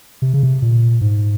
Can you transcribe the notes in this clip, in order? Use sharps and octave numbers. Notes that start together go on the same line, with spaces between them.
C3
C#3
C3
A#2
G#2